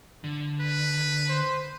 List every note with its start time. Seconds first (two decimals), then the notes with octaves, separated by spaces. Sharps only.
0.24 D3
0.61 B4
1.29 C5